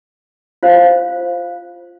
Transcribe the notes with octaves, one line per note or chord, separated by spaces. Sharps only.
F4 C5 F5